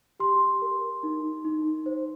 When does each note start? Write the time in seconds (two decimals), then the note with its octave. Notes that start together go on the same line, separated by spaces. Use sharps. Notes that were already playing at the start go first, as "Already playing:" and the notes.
0.20 G4 C6
0.62 A#4
1.03 D#4
1.45 D#4
1.86 C5